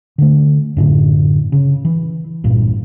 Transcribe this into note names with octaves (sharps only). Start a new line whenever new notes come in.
D3 A3
F#2 A2 D3
C#3
E3
C2 G2 A#2